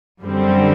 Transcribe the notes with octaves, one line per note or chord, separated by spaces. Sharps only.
F#2 D3 G3 C4